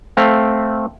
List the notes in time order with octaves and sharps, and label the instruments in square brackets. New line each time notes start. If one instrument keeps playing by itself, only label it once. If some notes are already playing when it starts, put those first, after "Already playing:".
[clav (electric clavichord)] A3 C4 F5